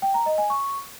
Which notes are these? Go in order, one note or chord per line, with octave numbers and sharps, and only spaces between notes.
G5
A#5
D#5
G#5
C#6